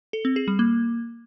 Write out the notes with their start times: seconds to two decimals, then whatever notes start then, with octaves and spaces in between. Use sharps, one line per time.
0.13 A4
0.25 C4
0.36 G#4
0.48 G3
0.59 A#3